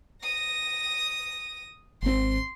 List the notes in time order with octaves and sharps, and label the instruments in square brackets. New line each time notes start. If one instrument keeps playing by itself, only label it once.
[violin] D#6 A#6
[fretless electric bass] G#1 C4 [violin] C6